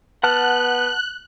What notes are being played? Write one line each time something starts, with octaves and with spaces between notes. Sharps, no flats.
B3 F#5 A5 F6 F#6